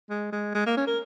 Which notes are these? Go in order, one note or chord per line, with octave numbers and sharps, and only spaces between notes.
G#3
G#3
G#3
A#3
C#4
A#4